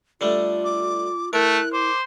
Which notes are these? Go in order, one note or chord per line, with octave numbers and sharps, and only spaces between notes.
D3 G3 A3 F4
D6
A3 E4 A#4 F#6
C5 D6